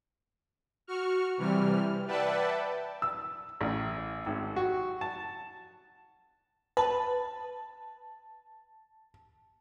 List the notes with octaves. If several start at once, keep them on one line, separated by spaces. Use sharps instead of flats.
F#4 C#6 F6
C3 E3 G3 F6
B4 D5 E5 F#5 G5 A5
E6
A1
G#1
F#4
A5
B4 A5